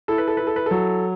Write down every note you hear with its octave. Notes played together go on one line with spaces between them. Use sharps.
E4 A4
B4
A4
E4 B4
A4
B4
F#3 A4